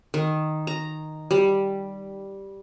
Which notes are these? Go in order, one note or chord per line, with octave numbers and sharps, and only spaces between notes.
D#3
A#5
G3